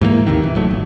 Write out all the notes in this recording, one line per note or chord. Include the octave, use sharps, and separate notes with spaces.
G#2 E3 G3 A#3
A1 D#2 C3 D#3
E3
D1 F#3 A3
G1